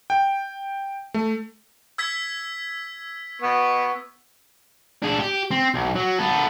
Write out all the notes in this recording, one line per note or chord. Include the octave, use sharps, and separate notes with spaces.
G5
A3
E6 G#6 B6
B3 C#6
D4 G#4
G4
C4
B1
F#3
B3 A4